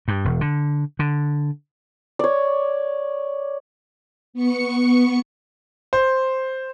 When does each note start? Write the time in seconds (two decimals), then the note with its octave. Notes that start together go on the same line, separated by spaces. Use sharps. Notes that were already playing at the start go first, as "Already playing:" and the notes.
0.08 G2
0.25 E1
0.41 D3
0.99 D3
2.19 C#5 D5
4.34 B3 C#6 C#7
5.93 C5